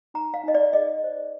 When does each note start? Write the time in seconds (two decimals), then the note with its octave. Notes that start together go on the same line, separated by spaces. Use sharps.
0.14 D#4 A#5
0.34 F5
0.44 D#4 D#5
0.54 D5
0.73 G#4 D#5
1.04 C5